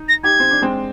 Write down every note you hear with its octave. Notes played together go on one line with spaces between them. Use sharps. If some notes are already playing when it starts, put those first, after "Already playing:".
Already playing: D#4
A#6
D#4 G4 G#6
C4
D4
G#3 C4